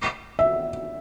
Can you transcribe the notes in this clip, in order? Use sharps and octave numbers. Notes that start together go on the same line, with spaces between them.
E5